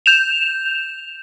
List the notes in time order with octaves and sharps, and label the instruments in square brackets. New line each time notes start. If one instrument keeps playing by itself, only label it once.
[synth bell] G6 E7 F7